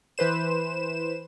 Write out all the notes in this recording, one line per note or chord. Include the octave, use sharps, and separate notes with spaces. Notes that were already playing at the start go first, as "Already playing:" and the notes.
E3 B4 C5 E7